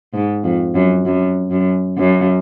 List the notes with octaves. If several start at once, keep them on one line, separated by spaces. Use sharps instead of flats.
G#2
F2
F#2
F#2
F#2
F#2